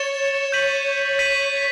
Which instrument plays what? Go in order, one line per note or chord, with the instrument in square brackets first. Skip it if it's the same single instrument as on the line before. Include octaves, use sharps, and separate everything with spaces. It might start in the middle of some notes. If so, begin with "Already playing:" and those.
Already playing: [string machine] C#5 [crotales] A6 C#7 E7 G7
[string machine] C#5 [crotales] G6 B6 D#7 F#7
[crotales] G6 B6 D#7 F#7